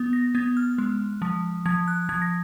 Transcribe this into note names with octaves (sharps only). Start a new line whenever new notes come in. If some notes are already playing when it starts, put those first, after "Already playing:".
Already playing: B3
A#6
B3 G#6
F6
G#3
F3
F3 G#6
F#6
F3 G#6
A#6